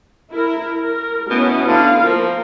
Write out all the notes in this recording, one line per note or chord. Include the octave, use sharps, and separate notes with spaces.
E4 A#4
A#4
B2 B3 C#4 E4
D3 E4 F5
F3 A#3 A#4